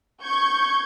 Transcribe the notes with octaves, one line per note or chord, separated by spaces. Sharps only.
C#6 G6 G#6